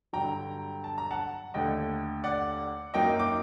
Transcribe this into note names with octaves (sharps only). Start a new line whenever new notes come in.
G2 D3 F#3 G5 A#5
A5
A#5
F#5 A5
D#2 D3 A3 D#5 G5
D5 F#5
F#2 F#3 A#3 D#4 D#5 G5
D6